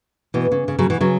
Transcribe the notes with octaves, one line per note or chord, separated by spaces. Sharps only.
B2 E3
C#3
C#3
C#3 F#3
B2 E3
C#3 F#3